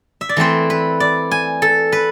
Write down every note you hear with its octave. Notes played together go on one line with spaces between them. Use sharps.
E5
D5
E3 A3 C4 C5
B4
D5
G#5
A4
B4